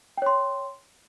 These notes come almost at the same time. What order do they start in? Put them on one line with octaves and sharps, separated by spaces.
G5 C#5 C6